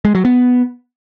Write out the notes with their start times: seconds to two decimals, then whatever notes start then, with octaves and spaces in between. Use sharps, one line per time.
0.05 G#3
0.15 F#3
0.25 B3